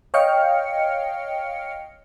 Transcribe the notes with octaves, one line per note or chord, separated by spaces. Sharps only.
C#5 D#5 F5 G5 F6 C#7